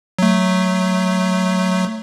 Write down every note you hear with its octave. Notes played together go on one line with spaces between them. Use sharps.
F#3 A3